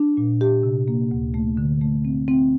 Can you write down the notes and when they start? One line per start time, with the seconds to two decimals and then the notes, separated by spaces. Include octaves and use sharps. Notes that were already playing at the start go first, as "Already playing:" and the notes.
Already playing: D4
0.17 A#2
0.41 G4
0.63 C3
0.88 A#3
1.11 D2
1.34 A3
1.57 D3
1.81 A3
2.05 C4
2.28 C4